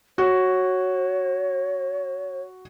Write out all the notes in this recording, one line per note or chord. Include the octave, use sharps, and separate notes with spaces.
F#4 C#5